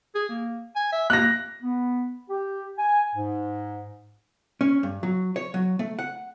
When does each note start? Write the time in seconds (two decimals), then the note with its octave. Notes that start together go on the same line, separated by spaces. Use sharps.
0.15 G#4
0.29 A#3
0.76 G#5
0.92 E5
1.10 A#3 F#6 A#6
1.63 B3
2.30 G4
2.78 G#5
3.15 G#2
4.61 C#4
4.83 G2
5.03 F#3
5.36 C#5
5.54 F#3
5.79 A3
5.99 F#5